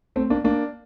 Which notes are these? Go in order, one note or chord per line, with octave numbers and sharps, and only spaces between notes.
A3 C4
A#3 D4
A#3 D4